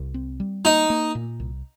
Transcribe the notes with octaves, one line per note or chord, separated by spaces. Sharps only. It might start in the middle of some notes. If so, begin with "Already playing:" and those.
Already playing: C2
C4
G3
A#3 D#4
A#3
A#2
C2